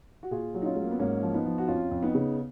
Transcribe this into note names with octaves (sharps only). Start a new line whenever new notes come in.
F#4
A#2 F4 G#4
F#3
D#4
C#4 F4
F#3 G#3
A#3
B3
G#2 A#3 C#4
F3
B3 D#4
F3
F#4
F2 C#4 F4
F2
B3 D#4
C#3